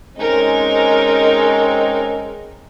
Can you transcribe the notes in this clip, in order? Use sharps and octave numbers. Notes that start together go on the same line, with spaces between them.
G#3 C4 C#4 D#4 A#4